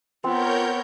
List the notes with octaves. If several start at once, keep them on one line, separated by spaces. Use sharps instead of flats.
B3 C4 F4 A#4 C#5 G6